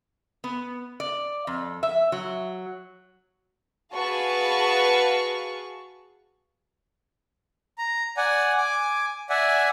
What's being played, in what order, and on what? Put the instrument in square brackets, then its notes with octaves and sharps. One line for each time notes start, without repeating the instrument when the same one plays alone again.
[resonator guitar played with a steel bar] B3
D5
F2
E5
F#3
[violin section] F#4 G#4 B4 F5 A5 C#6
[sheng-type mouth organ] A#5
D5 F#5 G#5
G#5 D6
D5 E5 F#5 G#5